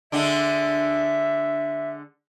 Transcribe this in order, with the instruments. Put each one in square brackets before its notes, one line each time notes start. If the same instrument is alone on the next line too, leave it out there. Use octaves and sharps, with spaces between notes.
[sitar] D3 G#3 D4 [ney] E5